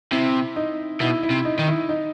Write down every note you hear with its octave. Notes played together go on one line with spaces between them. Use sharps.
C3 E4
D#4
B2 E4
E4
C3
D#4
D#3
E4
D#4